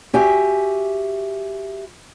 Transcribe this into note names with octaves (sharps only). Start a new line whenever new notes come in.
F#4 G4 E5 G#5